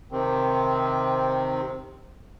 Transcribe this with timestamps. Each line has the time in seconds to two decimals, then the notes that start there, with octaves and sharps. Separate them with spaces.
0.12 C3 D#3 C4